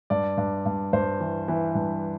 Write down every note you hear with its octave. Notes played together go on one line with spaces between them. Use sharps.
G2 D5
G2
G2
G2 C5
E3
E3
G2